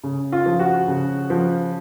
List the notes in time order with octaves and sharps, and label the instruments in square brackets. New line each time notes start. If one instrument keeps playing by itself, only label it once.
[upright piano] C#3
F4
F3
F#4
C#3
F3